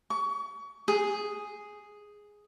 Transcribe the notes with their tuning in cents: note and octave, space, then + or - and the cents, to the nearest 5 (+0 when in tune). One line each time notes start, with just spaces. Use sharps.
C#6 +30
G#4 +0